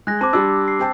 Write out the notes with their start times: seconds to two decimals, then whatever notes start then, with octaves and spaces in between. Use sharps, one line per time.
0.07 G#3 F#6 G#6 A#6
0.21 C4 A5 C6 D6
0.33 G3 D4 E6
0.68 C7
0.79 C4 G5 A5